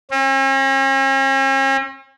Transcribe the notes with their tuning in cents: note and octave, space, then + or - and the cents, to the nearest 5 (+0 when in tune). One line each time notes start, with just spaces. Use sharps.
C#4 -45